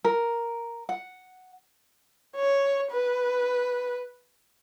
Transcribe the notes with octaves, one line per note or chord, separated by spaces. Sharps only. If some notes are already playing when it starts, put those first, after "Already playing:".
A#4
F#5
C#5
B4